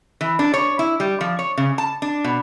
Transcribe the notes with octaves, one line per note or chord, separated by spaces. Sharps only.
E3
D4
C#5
E4
G3
F3
C#5
C#3
A5
D4
B2